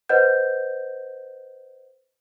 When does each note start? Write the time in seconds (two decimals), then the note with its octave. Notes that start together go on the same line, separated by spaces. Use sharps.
0.09 B4 C5 D#5 F#5 G6